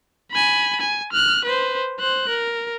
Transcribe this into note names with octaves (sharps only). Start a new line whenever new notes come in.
G#5 B5
G#5
F6 F#6
B4 C5
C5 F#6
A#4